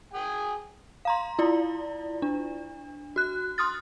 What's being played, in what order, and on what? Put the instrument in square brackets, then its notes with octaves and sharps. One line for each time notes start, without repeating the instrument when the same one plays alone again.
[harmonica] G#4 G5 G#5
[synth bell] F5 A#5 C6
E4 F4 D5
D4
F#4 F#6
C6 D#6 F6 A6